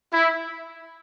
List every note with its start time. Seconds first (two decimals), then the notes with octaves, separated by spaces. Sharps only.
0.14 E4